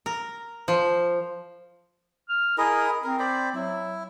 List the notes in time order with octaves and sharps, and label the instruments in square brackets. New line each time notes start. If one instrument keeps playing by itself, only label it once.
[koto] A#4
F3
[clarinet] F6
[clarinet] E4 [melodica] G#4 A#4 D#5
[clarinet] C4 [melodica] A#4
[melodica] C5 D5 B5
[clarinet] F#3 [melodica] E4